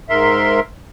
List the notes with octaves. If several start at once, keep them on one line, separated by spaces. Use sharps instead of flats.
G#2 A#4 E5 C6